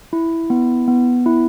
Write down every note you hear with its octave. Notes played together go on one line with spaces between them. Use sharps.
E4
B3
B3
E4